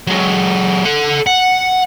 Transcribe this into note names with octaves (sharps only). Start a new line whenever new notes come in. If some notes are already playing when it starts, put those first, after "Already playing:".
F#3 G#3
A4 F#5
F#5